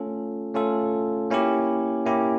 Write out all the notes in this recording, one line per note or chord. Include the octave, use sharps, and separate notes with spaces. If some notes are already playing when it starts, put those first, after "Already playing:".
Already playing: A3 C#4 F4 A4
A3 C#4 F4 A4
A#3 C#4 E4 G4
A#3 C#4 E4 G4